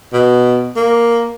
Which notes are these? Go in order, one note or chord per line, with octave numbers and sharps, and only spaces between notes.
B2
A#3